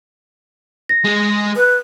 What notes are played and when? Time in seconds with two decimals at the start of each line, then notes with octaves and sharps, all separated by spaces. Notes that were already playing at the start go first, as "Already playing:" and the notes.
0.89 A#6
1.05 G#3 G#4
1.56 B4